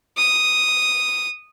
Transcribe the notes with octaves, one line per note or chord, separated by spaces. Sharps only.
D#6